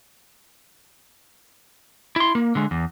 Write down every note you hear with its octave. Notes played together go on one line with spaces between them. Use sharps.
E4 C6
A#3
D3 G#3
E2